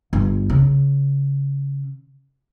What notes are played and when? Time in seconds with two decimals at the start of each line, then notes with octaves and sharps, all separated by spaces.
0.13 G1
0.50 C#3